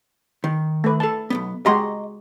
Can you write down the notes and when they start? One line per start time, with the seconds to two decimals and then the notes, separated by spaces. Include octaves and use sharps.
0.44 D#3
0.84 A3 B4
1.00 A4 A5
1.30 B1 G#2 B3
1.66 G#3 F#4 G4 D#5 A#5 C6